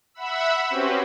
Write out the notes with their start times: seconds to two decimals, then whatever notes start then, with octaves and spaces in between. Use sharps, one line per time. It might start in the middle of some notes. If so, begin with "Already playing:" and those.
0.14 E5 F#5 B5 E6
0.70 C4 C#4 F#4 G4 B4 C5